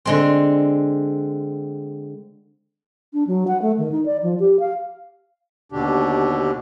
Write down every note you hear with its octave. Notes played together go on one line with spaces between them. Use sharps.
D3 G#3 C4
D4
F#3
F#5
A3
D#3
D#4
D5
F3
G4
F5
D#2 B2 D3 D4 G4